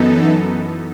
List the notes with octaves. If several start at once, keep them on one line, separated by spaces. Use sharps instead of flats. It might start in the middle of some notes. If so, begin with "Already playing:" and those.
Already playing: F#2 E3 B3 D#4 A4